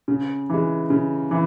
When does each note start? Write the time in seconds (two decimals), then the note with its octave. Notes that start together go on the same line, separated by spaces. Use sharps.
0.08 C#3
0.49 E3 G#3
0.90 C#3
1.31 E3